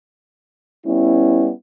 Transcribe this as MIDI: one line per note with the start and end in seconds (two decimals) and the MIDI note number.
0.86 1.50 55
0.86 1.50 59
0.86 1.50 61
0.86 1.50 64